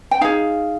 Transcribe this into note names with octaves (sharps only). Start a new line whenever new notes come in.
G5
D#4 G#4 F5